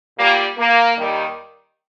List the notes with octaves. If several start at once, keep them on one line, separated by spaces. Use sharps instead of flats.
A#2 G3 A#3
A#3
D#2 D#3 G3